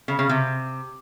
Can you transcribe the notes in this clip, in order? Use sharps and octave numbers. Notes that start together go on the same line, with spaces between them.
C#3
C#3
C3